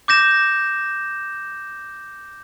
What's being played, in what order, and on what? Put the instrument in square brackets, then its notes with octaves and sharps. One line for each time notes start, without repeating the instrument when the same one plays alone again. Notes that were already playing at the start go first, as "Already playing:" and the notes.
[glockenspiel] D6 G6 A#6 E7